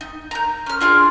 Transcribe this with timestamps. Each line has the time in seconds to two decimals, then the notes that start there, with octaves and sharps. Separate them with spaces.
0.01 D#4
0.31 A#5 G6
0.66 C#4 F6
0.80 D4 F4 G#4 F5